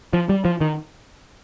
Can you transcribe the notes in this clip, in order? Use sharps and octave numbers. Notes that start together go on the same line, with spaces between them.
F3
G3
F3
D#3